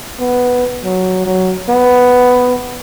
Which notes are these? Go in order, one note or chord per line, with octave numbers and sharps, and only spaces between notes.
B3
F#3
F#3
B3